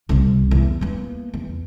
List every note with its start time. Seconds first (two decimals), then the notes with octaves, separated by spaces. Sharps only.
0.09 C2 C3
0.51 E2
0.81 A#3 B3
1.34 E2